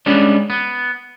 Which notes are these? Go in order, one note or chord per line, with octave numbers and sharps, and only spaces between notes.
G3 G#3 B3 C#4 D4
B3